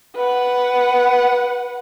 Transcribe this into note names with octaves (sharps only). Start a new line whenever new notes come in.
B4 F#5